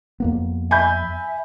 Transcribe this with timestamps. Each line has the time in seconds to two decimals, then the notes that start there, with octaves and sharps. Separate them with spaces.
0.20 F2 A#3 B3
0.71 E5 G#5 B5 G6